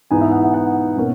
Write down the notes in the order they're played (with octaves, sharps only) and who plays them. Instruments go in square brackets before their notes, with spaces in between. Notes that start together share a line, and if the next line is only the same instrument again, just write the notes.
[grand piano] G#2 E3 B3 D#4 G#5
E5
F#5
F#5
F#5
B2 A#3 C#4